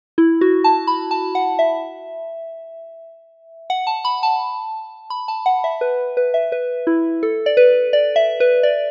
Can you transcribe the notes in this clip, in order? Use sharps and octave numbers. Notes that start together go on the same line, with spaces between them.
E4
F#4
A5
B5
A5
F#5
E5
F#5
A5
B5
A5
B5
A5
F#5
E5
B4
B4
E5
B4
E4
A4
D5
B4
D5
E5
B4
D5